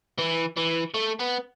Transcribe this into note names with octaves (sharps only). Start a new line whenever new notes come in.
E3
E3
A3
B3